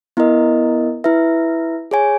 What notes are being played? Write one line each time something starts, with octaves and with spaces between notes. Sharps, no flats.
B3 E4 A#4 D#5
E4 B4 E5
G#4 C#5 G#5